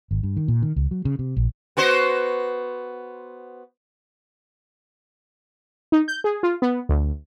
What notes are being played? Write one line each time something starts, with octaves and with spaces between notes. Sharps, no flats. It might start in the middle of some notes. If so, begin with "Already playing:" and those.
G#1
G2
D#3
A#2
D#3
C#2
F#3
C#3
C3
A#1
B3 F#4 C5
D#4
G6
G#4
F4
B3
D2